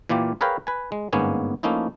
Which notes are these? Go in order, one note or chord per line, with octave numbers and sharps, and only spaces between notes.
A#2 E3 A#3 F4 G4
G#4 A#4 B4 C#5 F5 G5
B4 G#5
G#3
G1 G#2 A#3 B3 C#4 G#5
F3 A3 A#3 C#4 D#4 E4